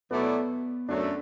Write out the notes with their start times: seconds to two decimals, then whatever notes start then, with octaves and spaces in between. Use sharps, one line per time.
0.11 B2 F#3 A3 B3 E4 D5
0.89 F#2 F#3 A3 D4